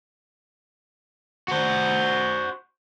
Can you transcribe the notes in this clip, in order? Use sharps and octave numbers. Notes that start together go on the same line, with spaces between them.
F#4 C5